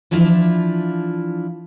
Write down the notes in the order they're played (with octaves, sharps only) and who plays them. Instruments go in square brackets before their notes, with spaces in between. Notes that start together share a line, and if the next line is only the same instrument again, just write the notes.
[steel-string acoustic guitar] E3 F3 D4 E4 F4